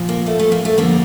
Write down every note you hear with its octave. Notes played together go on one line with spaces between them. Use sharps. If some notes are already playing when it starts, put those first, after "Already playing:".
Already playing: A#2 F3
A#3
A3
A3
A#3
A3
F2 D3 G3 A#3